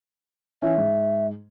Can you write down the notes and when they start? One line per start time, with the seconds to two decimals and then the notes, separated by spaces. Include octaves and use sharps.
0.62 E3 C#4 E5
0.78 G#2